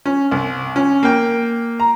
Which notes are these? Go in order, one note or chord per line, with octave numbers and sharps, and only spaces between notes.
C#4
C2
C#4
A#3 G5
A#5